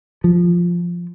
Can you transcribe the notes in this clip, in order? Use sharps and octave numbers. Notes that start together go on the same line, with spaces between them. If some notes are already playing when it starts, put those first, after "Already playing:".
F3